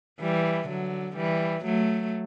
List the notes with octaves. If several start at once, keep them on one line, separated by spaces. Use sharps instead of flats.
E3 G3
D3 F#3
E3 G3
F#3 A3